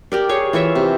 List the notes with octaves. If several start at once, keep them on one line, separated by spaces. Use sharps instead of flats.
G4 A#4 D5
G#4 C#5 F5
E3 F4 C#5 E5
C3